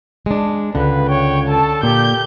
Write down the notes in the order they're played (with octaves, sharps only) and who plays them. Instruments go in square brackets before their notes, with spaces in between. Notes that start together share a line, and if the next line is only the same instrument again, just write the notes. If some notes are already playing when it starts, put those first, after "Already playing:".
[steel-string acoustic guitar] G#3 D4
[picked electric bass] C#2 [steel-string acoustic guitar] D3 [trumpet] B4
[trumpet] C#5 [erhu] G5
[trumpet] A4 [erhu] A5
[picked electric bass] A#2 [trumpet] G4 [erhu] G6